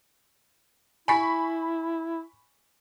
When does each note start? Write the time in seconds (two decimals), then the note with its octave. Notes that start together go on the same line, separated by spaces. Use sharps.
1.08 E4 G#5 B5 C#6 B6